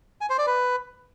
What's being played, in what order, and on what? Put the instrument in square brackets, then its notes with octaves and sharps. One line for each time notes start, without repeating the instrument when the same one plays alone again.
[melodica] G#5
C5
D5
B4